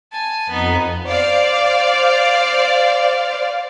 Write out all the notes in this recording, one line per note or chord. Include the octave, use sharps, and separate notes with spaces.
G#5 A5
F2 B3 D#4
C5 D5 F5